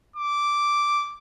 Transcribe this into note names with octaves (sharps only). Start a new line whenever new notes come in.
D6